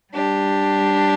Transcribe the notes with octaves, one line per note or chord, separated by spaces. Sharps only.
G3 D4 G4